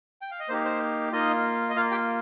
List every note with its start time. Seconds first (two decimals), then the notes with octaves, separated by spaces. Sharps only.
0.21 G5
0.31 F5
0.40 D#5
0.49 A#3 D#4 G4 C5
0.65 C5
1.12 A#3 D#4 F4 D#5
1.69 D#5
1.76 A#3 F4 F5
1.91 G4 G5